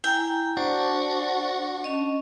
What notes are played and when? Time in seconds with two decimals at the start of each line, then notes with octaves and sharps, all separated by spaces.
0.04 E4 G5 G#5 A#5
0.57 D4 F#4 C5
1.84 C#4 D#5